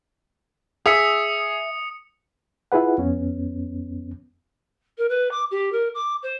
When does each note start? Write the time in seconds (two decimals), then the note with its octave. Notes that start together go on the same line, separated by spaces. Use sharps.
0.86 G#4 E5 D#6 C#7
2.72 E4 F4 G#4 B4 F#5
2.98 F2 B3 C#4
4.98 A#4
5.09 B4
5.31 D6
5.51 G4
5.72 A#4
5.94 D6
6.22 C5